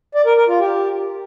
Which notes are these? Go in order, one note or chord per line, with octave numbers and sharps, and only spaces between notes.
D5
A#4
A#4
F4
G4